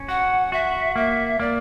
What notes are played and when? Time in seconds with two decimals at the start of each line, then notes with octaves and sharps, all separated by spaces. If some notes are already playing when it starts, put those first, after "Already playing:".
Already playing: C#4
0.08 F#4 F#5
0.52 F#4 E5
0.96 A#3 E5
1.40 A#3 D5